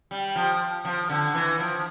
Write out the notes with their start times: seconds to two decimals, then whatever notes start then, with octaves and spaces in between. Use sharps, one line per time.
0.11 G3
0.36 F3
0.85 F3
1.09 D3
1.34 E3
1.59 F3